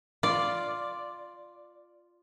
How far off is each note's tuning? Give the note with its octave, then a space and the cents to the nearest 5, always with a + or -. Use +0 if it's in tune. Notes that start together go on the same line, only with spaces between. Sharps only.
F4 +0 D5 +0